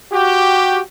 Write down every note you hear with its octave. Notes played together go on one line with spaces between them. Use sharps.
F#4 G4